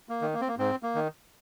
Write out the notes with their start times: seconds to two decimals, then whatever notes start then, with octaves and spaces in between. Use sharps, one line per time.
0.09 A#3
0.22 D#3
0.34 A#3
0.41 C4
0.48 A#3
0.58 G#2 C4
0.83 A#3
0.95 D#3